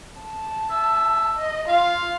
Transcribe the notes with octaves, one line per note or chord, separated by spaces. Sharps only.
A5
E5
D#5
F4 F5